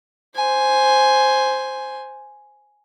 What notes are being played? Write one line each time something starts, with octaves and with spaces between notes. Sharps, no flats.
C5 G#5